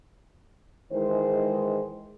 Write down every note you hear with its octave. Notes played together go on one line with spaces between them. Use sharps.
G#2 D#3 E3 G#3 C5